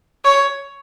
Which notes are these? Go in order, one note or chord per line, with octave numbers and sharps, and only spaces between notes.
C#5